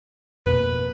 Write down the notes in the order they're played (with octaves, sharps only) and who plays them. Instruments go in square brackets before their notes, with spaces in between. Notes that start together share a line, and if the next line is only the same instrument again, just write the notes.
[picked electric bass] F2 B2 A#3 [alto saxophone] B4